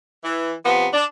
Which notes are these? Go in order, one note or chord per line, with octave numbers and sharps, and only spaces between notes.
E3
C3 F3 B3
D4